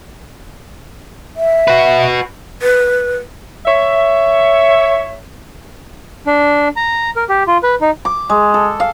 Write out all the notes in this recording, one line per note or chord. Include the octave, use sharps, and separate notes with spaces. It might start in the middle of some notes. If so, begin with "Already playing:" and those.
E5
F#4 B4
B4
C#5 E5
D4
A#5
A#4
G4
F4
B4
D#4
D6
G#3
A4
F5